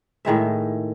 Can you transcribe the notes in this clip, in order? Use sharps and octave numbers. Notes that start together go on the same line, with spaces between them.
A2 D#3 G#3 E5